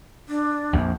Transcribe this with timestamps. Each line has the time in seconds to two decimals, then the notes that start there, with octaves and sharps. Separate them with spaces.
0.29 D4
0.73 A#1 F2